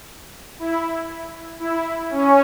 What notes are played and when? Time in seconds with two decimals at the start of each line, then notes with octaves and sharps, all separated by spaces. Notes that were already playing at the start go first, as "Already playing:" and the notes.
0.59 E4
1.60 E4
2.10 C#4